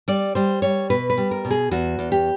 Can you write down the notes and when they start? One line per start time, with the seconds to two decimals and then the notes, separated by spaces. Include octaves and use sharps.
0.08 G3 D5
0.35 G3 C5
0.62 G3 C#5
0.90 B2 B4
1.10 B4
1.18 G3
1.31 A#4
1.45 B2
1.51 G#4
1.71 E2 F#4
1.99 E2
2.12 G4